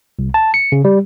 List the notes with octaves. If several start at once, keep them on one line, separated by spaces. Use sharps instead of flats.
C2
A5
C#7
C#3
G3